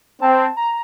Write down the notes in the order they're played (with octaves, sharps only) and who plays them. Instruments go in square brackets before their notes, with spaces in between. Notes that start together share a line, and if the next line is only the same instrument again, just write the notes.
[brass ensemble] C4 [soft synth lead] A5
[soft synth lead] A#5